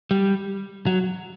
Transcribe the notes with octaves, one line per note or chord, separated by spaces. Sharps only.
G3
F#3